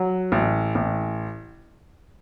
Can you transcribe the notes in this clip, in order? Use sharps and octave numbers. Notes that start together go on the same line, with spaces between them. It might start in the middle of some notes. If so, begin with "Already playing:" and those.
Already playing: F#3
A1
A1